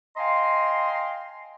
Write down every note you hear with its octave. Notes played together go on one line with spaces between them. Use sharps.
D#5 F5 G5 G#5 A#5 C6